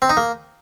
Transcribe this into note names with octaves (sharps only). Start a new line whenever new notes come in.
C4
D#4
A#3